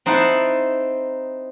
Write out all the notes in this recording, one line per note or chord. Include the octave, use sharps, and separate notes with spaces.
C4 D#4 E4 F#5 A5